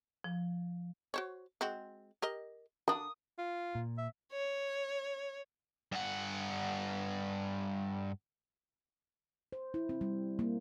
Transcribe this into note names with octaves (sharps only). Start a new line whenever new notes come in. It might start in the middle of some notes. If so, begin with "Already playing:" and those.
F3
F#4 C5 C#5
G#3 C4 F#4
G4 A#4 D#5
D3 D4 D#6
F4
A#2
E5
C#5
G2 F#5
C5
E4
C4
G3
A#3